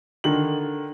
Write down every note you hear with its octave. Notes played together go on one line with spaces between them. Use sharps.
D3 D#3 F#7